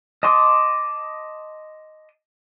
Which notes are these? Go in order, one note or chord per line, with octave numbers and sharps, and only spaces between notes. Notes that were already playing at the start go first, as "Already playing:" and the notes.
D#5 A5 C6 D6 D#6